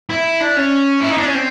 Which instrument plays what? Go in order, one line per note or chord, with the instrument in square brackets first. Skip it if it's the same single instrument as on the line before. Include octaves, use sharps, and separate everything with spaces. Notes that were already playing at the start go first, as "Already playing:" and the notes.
[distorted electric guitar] E4
D4
C#4
E4
D#4
D4
C#4
C4